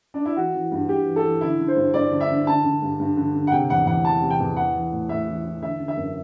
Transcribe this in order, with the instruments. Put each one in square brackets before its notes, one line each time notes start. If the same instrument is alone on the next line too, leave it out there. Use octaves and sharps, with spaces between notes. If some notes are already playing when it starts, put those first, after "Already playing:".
[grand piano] D4
E4
E3 F#4
E3
G2
G2 G4
E3
A4
E3
D3 E4
D3
C5
G2
G2 D5
D3
E5
D3
D3 A5
D3
G2
G2
D3
D3
F#5
C3 G5
E2 F#5
E2 F#5
E3 A5
C3
G5
E2
E3 F#5
E3
A2
A2 E5
E3
E3
D3 E5
D3
E5
F#2